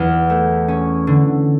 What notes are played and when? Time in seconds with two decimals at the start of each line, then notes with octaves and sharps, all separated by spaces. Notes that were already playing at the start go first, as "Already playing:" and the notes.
Already playing: E2
0.30 A3
0.68 C#4
1.07 D3